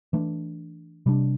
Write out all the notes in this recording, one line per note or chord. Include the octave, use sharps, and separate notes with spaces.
E3 A3 D4
C3 G3 D4